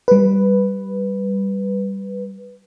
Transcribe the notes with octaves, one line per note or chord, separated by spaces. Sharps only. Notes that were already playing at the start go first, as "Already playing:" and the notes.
G3 B4